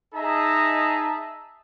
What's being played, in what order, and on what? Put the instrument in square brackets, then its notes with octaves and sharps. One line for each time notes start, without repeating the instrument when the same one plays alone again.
[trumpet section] D#4 G#4 D#5 E5 A5 A#5